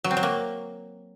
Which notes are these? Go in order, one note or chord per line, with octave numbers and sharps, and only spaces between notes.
F#3
C4
F#3
A#3